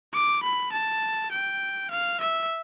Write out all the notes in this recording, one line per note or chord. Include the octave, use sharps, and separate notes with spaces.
D6
B5
A5
G5
F5
E5